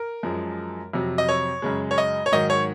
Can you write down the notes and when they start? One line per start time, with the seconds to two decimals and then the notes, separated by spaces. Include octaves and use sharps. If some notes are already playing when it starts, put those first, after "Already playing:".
Already playing: A#4
0.23 F#2 F3 G#3
0.93 F2 C3 F#3
1.18 D#5
1.29 C#5
1.62 F#2 C#3 G#3
1.91 C#5
1.98 D#5
2.26 C#5
2.32 G#2 D#3 F#3 D#5
2.50 C#5